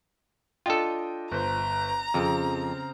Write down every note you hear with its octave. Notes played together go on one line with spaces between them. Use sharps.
D4 F4 A4 D#5 G5
G1 C5 A#5
F2 C#3 C4